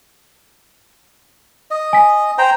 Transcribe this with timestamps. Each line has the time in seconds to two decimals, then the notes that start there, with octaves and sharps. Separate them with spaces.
1.71 D#5
1.93 G#5 B6
2.38 C5 G5 A#5